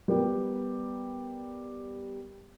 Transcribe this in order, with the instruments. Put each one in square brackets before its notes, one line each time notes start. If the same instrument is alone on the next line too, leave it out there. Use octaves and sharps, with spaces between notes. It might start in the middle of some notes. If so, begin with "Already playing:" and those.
[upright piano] G3 B3 G4 A#4